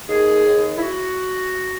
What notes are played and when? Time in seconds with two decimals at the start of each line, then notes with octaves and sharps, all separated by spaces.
0.08 D#2 G#4
0.46 D#2
0.78 E4
0.82 F#4